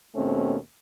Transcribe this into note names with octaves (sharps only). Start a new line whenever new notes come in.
D#2 B2 A3 C4 C#4